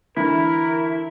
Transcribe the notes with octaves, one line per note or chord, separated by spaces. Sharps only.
D2 D3 E3 E4 A#4